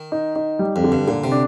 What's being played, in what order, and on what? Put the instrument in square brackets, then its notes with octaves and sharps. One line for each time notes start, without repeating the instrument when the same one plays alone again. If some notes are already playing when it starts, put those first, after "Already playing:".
Already playing: [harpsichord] D#3
[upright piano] D#4
D#4
G3
[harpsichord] F2
[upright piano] D3
[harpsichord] G2
[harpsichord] A#2 [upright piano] D3
[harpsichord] C3
[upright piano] D4